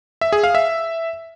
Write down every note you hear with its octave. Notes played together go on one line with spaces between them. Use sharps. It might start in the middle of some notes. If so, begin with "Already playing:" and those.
E5
G#4
F5
E5